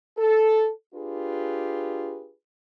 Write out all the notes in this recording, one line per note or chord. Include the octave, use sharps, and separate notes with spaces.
A4
D4 F4 G4 G#4 B4